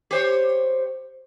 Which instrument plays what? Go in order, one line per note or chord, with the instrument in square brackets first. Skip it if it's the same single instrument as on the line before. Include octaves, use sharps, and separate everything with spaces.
[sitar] G4 C5 C#5